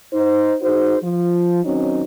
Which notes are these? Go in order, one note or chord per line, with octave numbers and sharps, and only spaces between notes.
D#4 C5
D#4 F#4 G#4 C5
F3
D#3 F#3 C4 C#4 D#4